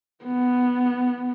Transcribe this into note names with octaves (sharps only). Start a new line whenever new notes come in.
B3